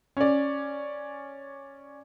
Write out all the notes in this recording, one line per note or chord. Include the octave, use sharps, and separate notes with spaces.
C#4 D5